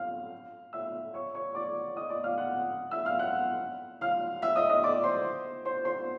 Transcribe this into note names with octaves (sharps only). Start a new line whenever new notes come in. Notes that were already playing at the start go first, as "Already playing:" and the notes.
Already playing: F5 F6
E5 E6
C#5 C#6
C#5 C#6
D5 D6
D#5 D#6
D5 D6
F5 F6
F#5 F#6
E5 E6
F5 F6
F#5 F#6
F5 F6
E5 E6
D#5 D#6
D#5 D#6
D5 D6
C5 C6
C5 C6
C5 C6